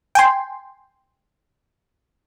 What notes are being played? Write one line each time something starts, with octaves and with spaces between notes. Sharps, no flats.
G5 G#5 C6